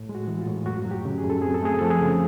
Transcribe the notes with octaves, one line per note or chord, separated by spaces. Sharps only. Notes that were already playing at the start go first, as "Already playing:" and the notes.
Already playing: A2
G#3
F#4
E3
F4
A2
F#2 F#4
F#3
G4
C#3
G#4
F#2
A4
C4 G#4
A4
A3 G#4
F3 A4
G#4
C#3